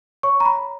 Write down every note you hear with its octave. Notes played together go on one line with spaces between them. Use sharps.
C#5 C#6
A#5
B5